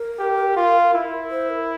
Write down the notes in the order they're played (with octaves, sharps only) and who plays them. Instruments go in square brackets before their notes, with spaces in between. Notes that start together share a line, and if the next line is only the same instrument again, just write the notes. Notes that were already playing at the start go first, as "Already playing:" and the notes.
Already playing: [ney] A#4
[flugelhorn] G4
F4
E4
[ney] C5
A#4